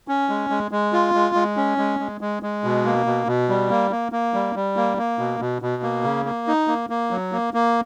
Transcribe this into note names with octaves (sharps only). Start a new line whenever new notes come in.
C#4
G#3
G#3
G#3
F4
G#3
G#3
C#4
G#3
G#3
G#3
G#3
B2
A#3
B2
B2
G3
A#3
A#3
A#3
G3
G3
A#3
A#3
B2
B2
B2
A#3
C#3
A#3
D#4
A#3
A#3
F#3
A#3
A#3